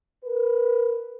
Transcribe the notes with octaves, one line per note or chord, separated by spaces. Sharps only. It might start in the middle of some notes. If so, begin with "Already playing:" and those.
A#4 B4